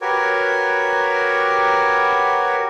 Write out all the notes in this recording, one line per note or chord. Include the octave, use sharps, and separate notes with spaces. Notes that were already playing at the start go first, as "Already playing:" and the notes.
F#4 G4 A#4 B4 C#5